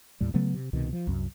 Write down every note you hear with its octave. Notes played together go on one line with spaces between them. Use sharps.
D#2 A2 G3
C#3 F#3 A3 B3
C3
C2 B2 D#3
F3
C2 F#2